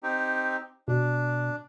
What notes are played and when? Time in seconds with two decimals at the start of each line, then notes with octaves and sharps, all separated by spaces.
0.03 C4 D#4 G4
0.88 B2 D4